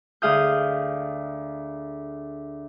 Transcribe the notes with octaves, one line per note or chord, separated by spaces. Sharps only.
D2 G#4 F5 D#6 G6